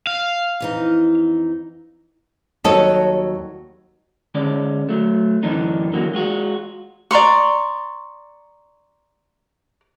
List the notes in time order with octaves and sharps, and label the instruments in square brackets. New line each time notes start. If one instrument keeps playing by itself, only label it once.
[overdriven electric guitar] F5
[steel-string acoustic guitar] F2 E3 D#4
[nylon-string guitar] D#2 F#3 G3 A4 C#5 D#5
[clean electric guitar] D3 G#3 C#4 D5
F#3 A3
F#2 D3 E3 D4 D#4
D3 E3 F#3 A#3 F#4
G#3 F4 F#4
[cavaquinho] D5 A#5 C6 C#6